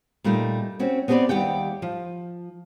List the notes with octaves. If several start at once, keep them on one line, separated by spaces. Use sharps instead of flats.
A#2 G3 A3 D#4
C4 C#4 F#4
B3 C4 G4 G#4 B4 D5
D#2 G3 G4 F#5 G5
F3